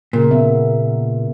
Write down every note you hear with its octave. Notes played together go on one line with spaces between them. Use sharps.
A#2 C#3 A#4
A#3 B3 E5